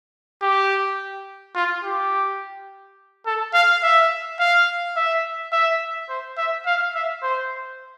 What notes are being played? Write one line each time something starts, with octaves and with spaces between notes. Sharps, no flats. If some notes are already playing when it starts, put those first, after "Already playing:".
G4
F4
G4
A4
F5
E5
F5
E5
E5
C5
E5
F5
E5
C5